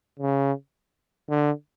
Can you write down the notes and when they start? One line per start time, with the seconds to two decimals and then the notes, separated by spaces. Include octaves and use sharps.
0.19 C#3
1.29 D3